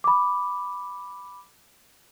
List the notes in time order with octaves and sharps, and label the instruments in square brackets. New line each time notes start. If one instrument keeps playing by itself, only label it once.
[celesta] B5 D6